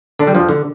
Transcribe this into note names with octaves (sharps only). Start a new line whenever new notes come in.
D3 D4
G3
F2 F3
D3